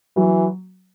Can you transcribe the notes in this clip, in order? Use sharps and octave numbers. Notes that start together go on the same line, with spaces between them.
E3 F#3